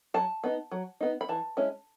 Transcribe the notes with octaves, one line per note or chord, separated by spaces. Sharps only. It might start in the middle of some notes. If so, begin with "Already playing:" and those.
F#3 A5
B3 D#4
F#3
B3 D#4
B5
E3 A5
G#3 C#4 E4